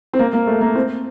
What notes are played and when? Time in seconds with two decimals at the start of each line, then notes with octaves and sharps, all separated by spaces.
0.13 C4
0.19 A#3
0.33 A#3
0.47 A3
0.61 A#3
0.75 C4